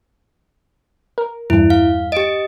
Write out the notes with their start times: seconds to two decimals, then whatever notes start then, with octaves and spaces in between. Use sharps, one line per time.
1.18 A#4
1.50 E2 G2 E4
1.70 F5
2.12 G4 D#5 D7